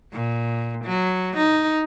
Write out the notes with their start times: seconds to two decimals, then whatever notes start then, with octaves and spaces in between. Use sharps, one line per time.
0.13 A#2
0.85 F#3
1.37 D#4